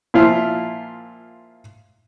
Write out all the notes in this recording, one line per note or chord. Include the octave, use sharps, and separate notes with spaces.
A#2 F3 E4 F4